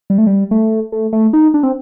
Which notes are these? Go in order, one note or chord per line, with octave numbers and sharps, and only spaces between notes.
G3
A3
G3
A3
A3
A3
D#4
D4
C4